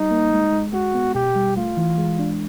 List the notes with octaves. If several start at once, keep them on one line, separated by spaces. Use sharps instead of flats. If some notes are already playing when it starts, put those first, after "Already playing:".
Already playing: G3 D#4
A#3
G#3
G#3
G#3 F#4
B3
B2 G4
G3
A3 F4
E3
G#3
D4